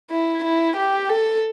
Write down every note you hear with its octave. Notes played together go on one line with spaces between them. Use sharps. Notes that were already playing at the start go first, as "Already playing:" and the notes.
E4
E4
G4
A4